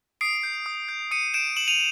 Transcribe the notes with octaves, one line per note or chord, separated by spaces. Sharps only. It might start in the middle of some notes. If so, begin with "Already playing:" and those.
D#6 C7 D7
G6
D#6
G6
D#6 C#7 D#7
G6 D7 E7
D#6 E7 F#7
D#7 F7